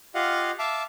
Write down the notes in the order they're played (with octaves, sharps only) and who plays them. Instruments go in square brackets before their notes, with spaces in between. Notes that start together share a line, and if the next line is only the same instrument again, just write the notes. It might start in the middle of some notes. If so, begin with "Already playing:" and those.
[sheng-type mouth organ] F4 G4 D#5 F5 F#5
E5 F5 A5 D6